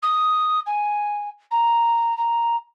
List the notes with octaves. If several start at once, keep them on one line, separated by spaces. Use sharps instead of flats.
D#6
G#5
A#5
A#5